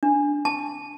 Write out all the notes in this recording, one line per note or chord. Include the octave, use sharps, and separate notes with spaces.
D4
A5